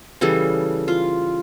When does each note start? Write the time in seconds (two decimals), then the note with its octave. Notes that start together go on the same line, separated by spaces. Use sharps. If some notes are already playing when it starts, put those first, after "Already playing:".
0.21 C#3 E3 G3 A4
0.88 F4